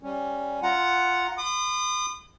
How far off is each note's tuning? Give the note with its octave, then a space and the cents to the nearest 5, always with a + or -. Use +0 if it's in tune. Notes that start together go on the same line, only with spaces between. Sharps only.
G3 +0 C#4 +0
F4 +0 F#5 +0 A#5 +0
B5 +45 D#6 -35